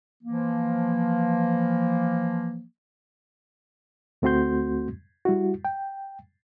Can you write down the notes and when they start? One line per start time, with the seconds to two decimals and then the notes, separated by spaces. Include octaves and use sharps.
0.23 E3 F3 A#3
4.22 D2 A3 C4 F#4 C6 G6
5.25 G3 E4 F#4
5.65 G5